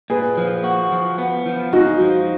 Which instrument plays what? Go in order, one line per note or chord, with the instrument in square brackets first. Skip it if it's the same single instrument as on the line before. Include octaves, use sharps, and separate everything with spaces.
[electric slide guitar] A#2 [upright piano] G#4 B4
[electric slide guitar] F3
F#4
F3
B3
F3
[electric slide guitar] G#3 [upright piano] D#4 F#4
[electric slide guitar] F3